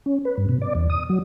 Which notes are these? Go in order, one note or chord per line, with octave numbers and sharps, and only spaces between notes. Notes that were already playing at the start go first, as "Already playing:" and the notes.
C#4
B4
G2
B2
D5
E2
D#6
F#3